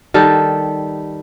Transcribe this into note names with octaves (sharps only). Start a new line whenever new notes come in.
D#3 G3 A4